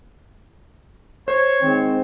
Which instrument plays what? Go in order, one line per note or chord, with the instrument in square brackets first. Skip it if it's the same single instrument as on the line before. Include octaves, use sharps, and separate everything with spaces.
[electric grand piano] C5 [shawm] C#5
[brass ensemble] D#3 G#3 C4